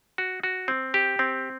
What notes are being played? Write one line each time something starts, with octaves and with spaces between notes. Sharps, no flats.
F#4
F#4
C4
G4
C4